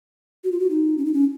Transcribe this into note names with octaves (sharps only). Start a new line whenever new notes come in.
F#4
F4
F#4
D#4
C#4
D#4
C#4